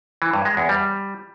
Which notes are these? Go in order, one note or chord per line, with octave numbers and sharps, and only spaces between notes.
E3
G2
G#3
E2
G3